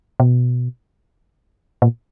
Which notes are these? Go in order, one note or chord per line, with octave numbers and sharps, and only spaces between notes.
B2
A#2